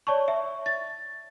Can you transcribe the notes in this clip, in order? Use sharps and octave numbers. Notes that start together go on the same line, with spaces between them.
C#5 D5 A5 C#6
E5
A6